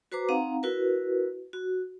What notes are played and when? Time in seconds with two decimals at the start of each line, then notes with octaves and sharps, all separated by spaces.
0.12 F#4 B4 C5 A#5 D6
0.29 C4 D#4 F5 F#5 A#5
0.63 E4 F#4 A#4 B4
1.53 F#4